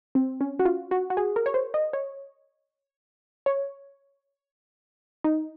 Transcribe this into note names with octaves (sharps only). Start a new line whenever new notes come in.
C4
C#4
F#4
F4
F#4
F#4
G#4
A#4
C#5
C5
D#5
C#5
C#5
D#4